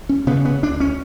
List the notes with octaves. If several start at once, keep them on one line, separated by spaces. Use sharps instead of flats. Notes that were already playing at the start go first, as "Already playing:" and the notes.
C#4
C#3 B3
B3
D2 D4
C#4